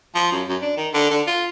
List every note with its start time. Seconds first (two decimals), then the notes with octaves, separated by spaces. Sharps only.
0.15 F3
0.32 F#2
0.49 F#2
0.62 D4
0.77 D#3
0.94 D3
1.11 D3
1.27 F4